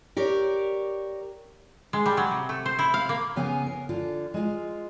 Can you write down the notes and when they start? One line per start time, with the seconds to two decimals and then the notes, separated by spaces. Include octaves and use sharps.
0.17 G4 A#4 C#5 D5
1.93 G#3
2.06 G3
2.17 F#3
2.31 C3
2.49 A3
2.66 C5
2.79 E4
2.94 F5
3.09 A#3
3.36 C#3 B3 F5 G#5
3.66 A#4
3.89 D3 F4
4.34 G#3 F4